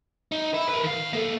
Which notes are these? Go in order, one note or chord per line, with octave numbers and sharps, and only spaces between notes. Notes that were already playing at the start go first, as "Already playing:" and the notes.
D#4
E4
A#4 B4
D#3 F5
A#3 A4